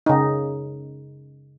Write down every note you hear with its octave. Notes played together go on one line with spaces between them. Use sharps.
C#3 D#4